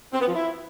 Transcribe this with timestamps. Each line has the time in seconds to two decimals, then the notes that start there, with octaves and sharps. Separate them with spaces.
0.13 C4
0.20 B3
0.27 F3
0.35 E4